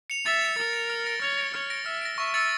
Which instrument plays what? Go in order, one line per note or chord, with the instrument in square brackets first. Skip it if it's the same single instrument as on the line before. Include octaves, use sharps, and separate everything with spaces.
[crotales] C#7 F7
[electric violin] E5 [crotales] A6
[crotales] C#7 F7
[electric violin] A#4 [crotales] A6
[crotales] C#7 F7
F6
A#6 D7
[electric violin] C#5 [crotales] F6
[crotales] A#6 D7
[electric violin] C#5 [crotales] F6
[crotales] A#6 D7
[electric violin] E5 [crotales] F6
[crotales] A#6 D7
[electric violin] E5 [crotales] C#6
[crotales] E6 A6 C#7